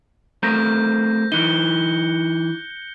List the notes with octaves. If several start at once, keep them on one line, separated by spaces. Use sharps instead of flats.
A3 C4 A#4 G6 A#6
E3 D#4 F#6 C#7 G7